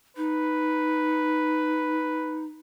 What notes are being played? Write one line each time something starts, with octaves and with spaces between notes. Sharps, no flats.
D#4 B4